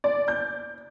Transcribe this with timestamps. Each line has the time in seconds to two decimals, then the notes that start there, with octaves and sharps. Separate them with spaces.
0.04 D5
0.28 G6